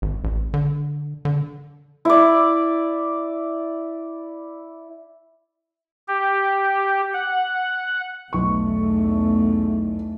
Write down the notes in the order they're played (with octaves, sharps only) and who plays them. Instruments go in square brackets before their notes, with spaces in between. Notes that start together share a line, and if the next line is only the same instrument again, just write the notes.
[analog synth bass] G#1
A1
D3
D3
[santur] E4 D5
[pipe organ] G4
F#5
[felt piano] B1 C#6 [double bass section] E2 A3